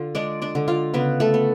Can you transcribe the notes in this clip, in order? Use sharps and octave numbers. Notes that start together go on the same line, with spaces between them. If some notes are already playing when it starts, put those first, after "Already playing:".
Already playing: D3 F4
G#3 D4 D5
D4 D5
D3
F4 F5
C#3 B3 B4
A3 A4
B3